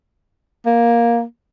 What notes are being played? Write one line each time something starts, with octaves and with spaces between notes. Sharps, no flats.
A#3